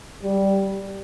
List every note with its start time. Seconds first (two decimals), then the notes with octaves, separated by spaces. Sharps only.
0.23 G3